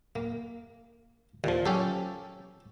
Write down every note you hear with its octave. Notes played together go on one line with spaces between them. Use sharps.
A#3
D#2 A#2 F3
F#3 C#4 G4 A4